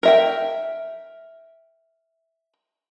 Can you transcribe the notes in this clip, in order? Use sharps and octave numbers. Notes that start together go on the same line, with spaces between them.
A#4 E5 G5